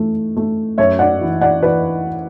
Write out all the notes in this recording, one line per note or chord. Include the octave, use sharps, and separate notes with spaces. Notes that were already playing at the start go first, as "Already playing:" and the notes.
Already playing: E3 A3
A3
F#2 C#5 E5
D5 F#5
E3
D5 F#5
E3 B4 D5